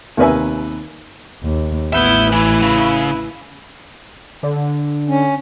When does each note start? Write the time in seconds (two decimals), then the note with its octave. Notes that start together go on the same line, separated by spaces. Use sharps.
0.17 D#2 C3 A#4 B4 E5 G#5
1.43 D#2
1.93 A1 B3 E4 E5 G6
2.32 E3 E4 B4
2.62 C#3
4.43 D3
5.09 C#4